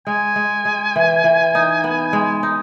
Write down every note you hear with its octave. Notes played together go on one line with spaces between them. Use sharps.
G#3 G#5
G#3
G#3
E3
E3
D#4
B3
G#3
D#4